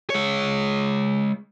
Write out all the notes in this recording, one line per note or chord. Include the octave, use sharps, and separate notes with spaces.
G#3 C#5